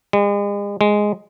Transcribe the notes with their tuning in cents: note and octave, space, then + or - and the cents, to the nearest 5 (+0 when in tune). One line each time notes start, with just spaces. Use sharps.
G#3 -40
G#3 +0